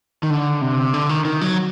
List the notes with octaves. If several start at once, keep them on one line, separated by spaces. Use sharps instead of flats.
D#3
D3
C3
D3
D#3
D#3
F#3